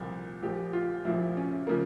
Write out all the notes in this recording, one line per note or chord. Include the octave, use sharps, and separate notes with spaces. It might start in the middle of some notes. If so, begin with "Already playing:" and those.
Already playing: C2 A#2 F3
A#1 A#2 F3 G4
F4
A#1 A#2 F3 E4
C#4
C#3 F3 A#3